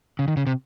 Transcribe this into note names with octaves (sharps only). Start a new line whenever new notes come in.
C#3
D#3
C#3
C3